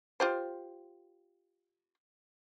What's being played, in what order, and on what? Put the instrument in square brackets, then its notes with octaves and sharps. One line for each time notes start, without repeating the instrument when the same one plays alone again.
[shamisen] F4 G4 C5